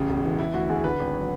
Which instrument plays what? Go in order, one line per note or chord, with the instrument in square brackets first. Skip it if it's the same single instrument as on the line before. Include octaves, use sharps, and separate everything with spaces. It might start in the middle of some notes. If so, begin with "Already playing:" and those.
Already playing: [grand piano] A1 C#3
E1
E3
E3 E4
D2 F#4
D2 G#4
D3 B4
G#1
F#3